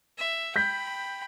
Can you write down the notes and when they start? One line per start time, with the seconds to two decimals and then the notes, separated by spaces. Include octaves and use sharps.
0.18 E5
0.56 G5 B5 G6 B6